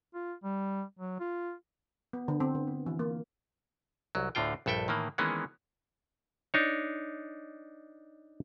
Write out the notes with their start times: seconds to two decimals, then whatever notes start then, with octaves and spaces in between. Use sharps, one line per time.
0.15 F4
0.44 G3
0.99 F#3
1.20 F4
2.13 B3
2.28 D3
2.40 C4
2.55 D3
2.67 B3
2.86 E3
2.99 A#3
4.15 C2 F#3
4.35 D2 A2 D3 F4 G5
4.66 A#1 G2 A4 E5 G5
4.88 A2 D#3 E3 A#3
5.18 D#3 E3 G#3 A#3 B3 C#4
6.54 D4 D#4 C#5